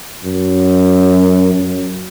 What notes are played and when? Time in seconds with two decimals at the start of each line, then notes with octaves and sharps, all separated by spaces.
0.24 F#2
1.54 F#2